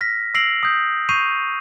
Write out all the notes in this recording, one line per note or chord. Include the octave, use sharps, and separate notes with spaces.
F6 A#6 B6
E6 A#6 C7 D7 F7 F#7
D#6 G6
C#6 G6 C7 D#7 F7